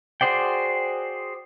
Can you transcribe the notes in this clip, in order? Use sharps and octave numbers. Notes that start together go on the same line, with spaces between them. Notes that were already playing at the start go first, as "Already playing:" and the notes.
F#4 G#4 C5 D5 G5